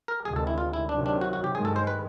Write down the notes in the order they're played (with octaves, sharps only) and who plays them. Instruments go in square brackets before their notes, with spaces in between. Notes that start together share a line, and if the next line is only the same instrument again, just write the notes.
[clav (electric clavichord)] A#4
[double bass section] D2 C3 D#3 G#3 [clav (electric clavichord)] G#4
[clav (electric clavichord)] A4
E4
F4
E4
[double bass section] C3 D#3 F#3 [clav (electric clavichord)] D4
[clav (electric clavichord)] D4
F#4
F#4
G4
[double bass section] G2 D#3 G#3 [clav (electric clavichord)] G#4
[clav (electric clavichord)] A4
C5
B4